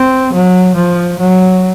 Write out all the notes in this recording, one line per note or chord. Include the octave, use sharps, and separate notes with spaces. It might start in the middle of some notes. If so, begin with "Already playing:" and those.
Already playing: C4
F#3
F3
F#3